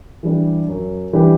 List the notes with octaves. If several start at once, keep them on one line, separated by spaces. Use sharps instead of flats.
E3 G3 D4 G4
F#2
E3 G3 D4 G4